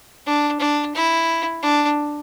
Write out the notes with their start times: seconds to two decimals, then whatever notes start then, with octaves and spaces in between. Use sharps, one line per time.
0.26 D4
0.60 D4
0.95 E4
1.63 D4